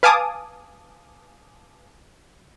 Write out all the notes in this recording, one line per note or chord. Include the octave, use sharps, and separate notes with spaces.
B4 F5 G#5 A5 D6 D#6